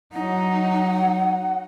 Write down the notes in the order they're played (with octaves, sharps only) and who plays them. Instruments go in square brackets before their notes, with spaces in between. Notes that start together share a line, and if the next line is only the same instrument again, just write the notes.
[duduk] F#3 [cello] D#4 [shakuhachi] F#5